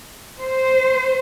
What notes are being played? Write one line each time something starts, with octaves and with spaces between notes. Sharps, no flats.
C5